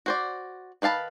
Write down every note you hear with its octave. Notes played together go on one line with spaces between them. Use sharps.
F#4 C5 D5
D#3 B4 F5 A5 B5